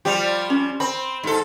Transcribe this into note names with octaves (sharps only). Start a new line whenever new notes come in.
F3 G3 G4
C#4
C4 B5
G#2 A4